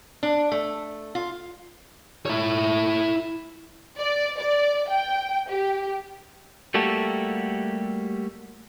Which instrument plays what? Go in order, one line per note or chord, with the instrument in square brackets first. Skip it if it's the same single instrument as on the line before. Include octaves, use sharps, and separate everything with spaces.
[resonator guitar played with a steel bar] D4
A3
F4
[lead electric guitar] E4 C#5
[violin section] D5
D5
G5
G4
[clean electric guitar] G3 A3 A#3 F#4 G4 A4